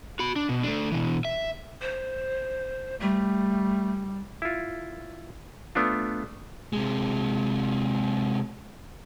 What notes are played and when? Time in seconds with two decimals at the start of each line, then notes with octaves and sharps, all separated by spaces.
0.19 F#4 B5
0.36 D4
0.49 B2
0.63 A3 D4
0.92 B2 E3
1.25 E5
1.81 C5
3.00 G3 A3
4.42 E4 F4
5.75 A3 B3 D4 F4
6.73 C3 G#3